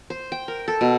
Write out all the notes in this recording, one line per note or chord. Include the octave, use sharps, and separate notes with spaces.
C5
G5
A#4
A4
B2